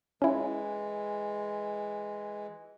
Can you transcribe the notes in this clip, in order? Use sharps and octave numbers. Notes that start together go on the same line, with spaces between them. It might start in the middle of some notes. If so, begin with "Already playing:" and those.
E3 G#3 C#4 E4